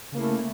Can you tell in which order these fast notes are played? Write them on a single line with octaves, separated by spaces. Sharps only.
C#3 A#3 E4 A3